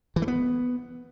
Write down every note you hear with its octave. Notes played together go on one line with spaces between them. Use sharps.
E3
A3
B3